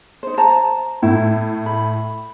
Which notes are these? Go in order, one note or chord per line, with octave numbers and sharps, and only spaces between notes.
D#4 C5
C5 A5 A#5
A2 E4
B5